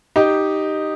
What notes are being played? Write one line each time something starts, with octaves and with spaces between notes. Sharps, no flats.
D#4 G4